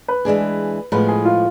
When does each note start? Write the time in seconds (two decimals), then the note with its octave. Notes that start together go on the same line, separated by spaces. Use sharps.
0.08 B4
0.25 E3 G#3 D4 G#4
0.92 A2 F3 G#3 B3 B4
1.08 G#4
1.25 F4